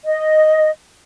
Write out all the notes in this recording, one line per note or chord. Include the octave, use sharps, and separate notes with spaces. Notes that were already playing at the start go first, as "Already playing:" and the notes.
D#5